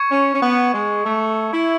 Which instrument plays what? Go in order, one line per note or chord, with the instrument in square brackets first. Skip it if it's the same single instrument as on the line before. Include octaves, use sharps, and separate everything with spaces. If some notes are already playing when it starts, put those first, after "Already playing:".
Already playing: [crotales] C#6 G#6 C#7 E7
[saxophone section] C#4
C#4
B3
G#3
A3
E4